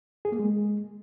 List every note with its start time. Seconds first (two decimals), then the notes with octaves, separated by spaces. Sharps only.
0.25 G#4
0.32 A#3
0.39 G#3